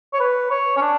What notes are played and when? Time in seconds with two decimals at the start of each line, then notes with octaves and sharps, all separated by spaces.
0.13 C#5
0.20 B4
0.51 C#5
0.77 C#4
0.81 D4